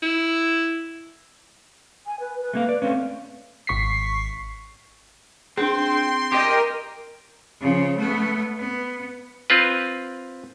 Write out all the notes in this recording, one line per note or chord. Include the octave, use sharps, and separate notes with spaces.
E4
G#5
B4
B4
A3 A#3 F5
D5
A3 C4 C#4 F5
G#1 C#6 B6 C7
C4 D4 G#4 G5 C6
G4 A#4 D#5 G5
C#3 F3
A3 B3
B3
C4 F4 B4